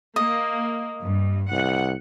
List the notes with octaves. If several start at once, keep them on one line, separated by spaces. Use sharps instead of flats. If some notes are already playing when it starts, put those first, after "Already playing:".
A#3 D#5
G2
C2 F#5